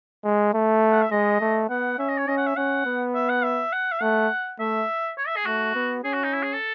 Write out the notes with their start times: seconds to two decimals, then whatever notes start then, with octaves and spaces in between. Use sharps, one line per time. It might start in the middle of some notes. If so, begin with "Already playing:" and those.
0.24 G#3
0.53 A3
0.92 F#5
1.02 E5
1.11 G#3 D#5
1.41 A3
1.69 B3 F#5
1.98 C#4 E5
2.09 D#5
2.18 C#5
2.28 C#4 D#5
2.37 F#5
2.47 E5
2.57 C#4 F#5
2.86 B3
3.14 E5
3.29 F#5
3.44 E5
3.72 F#5
3.92 E5
4.02 A3 F#5
4.59 A3 E5
5.18 C#5
5.27 E5
5.37 G#4
5.46 A3 F#4
5.75 B3
6.04 C#4 G#4
6.13 F#4
6.24 D#4
6.33 E4
6.43 G#4
6.53 A4